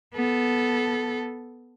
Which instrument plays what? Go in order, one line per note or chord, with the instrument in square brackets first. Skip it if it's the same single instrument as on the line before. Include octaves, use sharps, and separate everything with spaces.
[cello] B3 A4